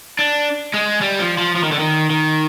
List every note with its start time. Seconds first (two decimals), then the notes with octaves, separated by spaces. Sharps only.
0.19 D4
0.74 G#3
1.01 G3
1.19 F3
1.38 F3
1.56 F3
1.63 D#3
1.72 D3
1.79 D#3
2.10 D#3